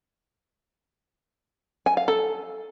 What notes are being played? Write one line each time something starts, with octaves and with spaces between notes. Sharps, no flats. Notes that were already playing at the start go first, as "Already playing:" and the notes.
G#5
F5
A4